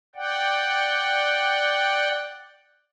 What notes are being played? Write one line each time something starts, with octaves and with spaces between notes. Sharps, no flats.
D5 F#5 G5